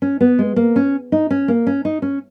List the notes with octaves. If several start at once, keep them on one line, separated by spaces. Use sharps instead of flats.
C#4
B3
G#3
A#3
C#4
D#4
C#4
A#3
C#4
D#4
C#4